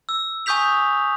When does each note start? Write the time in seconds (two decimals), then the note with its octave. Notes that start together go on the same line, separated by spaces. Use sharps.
0.09 E6
0.46 G#5 C#6 D#6 G6 B6 F7